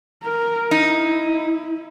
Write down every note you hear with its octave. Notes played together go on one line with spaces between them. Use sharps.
A#4
D#4 E4